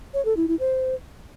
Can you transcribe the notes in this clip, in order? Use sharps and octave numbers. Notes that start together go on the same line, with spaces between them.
C#5
A4
E4
E4
C5